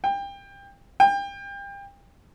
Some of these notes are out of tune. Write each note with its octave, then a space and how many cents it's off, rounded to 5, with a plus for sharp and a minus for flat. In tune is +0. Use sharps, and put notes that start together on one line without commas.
G5 +25
G5 +30